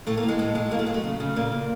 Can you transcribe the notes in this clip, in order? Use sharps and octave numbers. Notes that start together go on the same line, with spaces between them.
A2 A3
A#3
E3
G#3
A2 G#3
A2 G#3
F#3 A#3
A3
F#3 G#3
A3
C#3
C#3
A#2 A#3
A#2